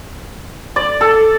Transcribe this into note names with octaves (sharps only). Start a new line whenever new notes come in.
D5
A4